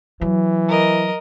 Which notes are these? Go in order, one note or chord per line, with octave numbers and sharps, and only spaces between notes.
E3 F#3
A#4 D#5